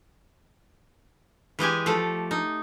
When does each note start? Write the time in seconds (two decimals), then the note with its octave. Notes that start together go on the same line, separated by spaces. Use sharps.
1.59 E3 G#3 G4 G#5
1.86 F3 A3 A4
2.31 D#4